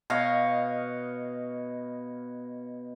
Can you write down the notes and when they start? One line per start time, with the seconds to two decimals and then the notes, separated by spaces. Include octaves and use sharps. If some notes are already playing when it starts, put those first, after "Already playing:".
0.10 B2 C#5 D#5 F5